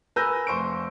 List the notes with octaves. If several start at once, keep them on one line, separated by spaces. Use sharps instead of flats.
A#4 B4 G#5 E6 G6 A#6
F1 C5 C#6 D7